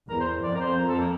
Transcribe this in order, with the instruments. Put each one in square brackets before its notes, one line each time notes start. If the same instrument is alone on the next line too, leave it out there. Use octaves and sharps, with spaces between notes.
[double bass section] E2 [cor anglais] A#4
[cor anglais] C5
[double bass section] F2 [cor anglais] D5
[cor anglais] A#4
C5
A#4
A4
A#3